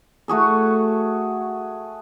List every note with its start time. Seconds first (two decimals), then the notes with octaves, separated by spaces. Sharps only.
0.28 A3 F#4 G#4 A4